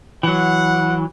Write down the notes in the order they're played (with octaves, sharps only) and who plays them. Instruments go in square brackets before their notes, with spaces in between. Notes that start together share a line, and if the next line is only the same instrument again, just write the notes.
[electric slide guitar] E3 F#3 [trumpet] F#5